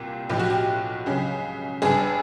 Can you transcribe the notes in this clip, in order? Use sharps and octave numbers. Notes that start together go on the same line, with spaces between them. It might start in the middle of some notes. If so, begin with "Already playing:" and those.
Already playing: C2 A#2 G4
B1 A2 F3 G4
F#4
G4
C#2 C#3 F#3
G1 G2 D3 G#4